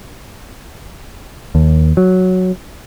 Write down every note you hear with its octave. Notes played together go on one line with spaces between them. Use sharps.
D#2
F#3